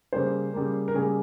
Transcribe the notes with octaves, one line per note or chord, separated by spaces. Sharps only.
C#3 G3 A#3 C5
C#3 G3 A#3
A#4
C#3 G3 A#3 G#4